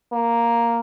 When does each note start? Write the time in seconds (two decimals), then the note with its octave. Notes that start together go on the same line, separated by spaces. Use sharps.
0.12 A#3